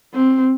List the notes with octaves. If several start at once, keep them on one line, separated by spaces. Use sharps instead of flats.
C4